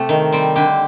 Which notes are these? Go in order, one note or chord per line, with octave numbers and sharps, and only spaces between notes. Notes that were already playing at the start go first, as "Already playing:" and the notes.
Already playing: C3 A3 C4 A4
D#3
G3 C4
D3 G4